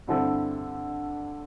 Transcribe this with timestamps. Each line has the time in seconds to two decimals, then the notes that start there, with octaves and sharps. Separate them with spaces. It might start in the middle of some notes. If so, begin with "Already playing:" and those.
0.07 G2 D3 C4 E4 A4